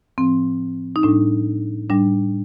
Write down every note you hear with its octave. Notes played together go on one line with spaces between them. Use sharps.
A2 F3 C4
D#4
A2 G3 D4
A2 G3 D4